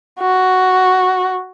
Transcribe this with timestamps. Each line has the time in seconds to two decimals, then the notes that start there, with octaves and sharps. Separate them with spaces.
0.20 F#4